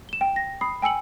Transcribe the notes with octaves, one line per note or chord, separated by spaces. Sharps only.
E7 G7
G5
A#6
B5 D#6 C7
G5 G#5 E6 C#7 F#7